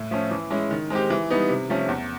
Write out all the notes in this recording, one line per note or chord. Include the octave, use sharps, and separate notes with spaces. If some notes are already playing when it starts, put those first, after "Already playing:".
Already playing: A2
F3 A3 C#4
E3
G#3 C#4 E4
D#3
G#3 C4 D#4 G4
E3
G3 B3 D#4
C3
F3 A3 C#4
E2